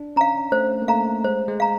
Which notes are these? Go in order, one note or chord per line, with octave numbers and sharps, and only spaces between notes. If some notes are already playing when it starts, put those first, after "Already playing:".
Already playing: D4
C#4 F5 A#5
A3 C5
A#3
A3 F5 A#5
G#3 C5
G#3
F5 A#5